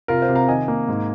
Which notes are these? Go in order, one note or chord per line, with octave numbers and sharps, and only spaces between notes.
C3 F4 A#4
C5 F5
C3
F5 A#5
D#3 D#5 G#5
A#3
G#2